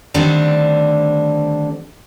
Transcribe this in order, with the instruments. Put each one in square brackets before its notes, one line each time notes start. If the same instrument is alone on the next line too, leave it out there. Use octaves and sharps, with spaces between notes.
[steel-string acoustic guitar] D3 D#3 G3 A3 C4 D4